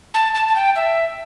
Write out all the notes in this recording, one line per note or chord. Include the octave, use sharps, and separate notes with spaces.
A5
A5
A5
G5
E5